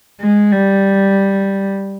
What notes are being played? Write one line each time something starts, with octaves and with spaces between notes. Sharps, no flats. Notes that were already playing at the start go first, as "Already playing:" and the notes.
G#3
G3